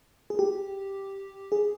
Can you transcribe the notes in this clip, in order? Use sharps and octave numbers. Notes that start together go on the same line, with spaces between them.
G#4
G4
G#4